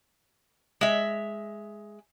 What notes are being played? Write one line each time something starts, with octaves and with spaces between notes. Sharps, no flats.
G#3 E5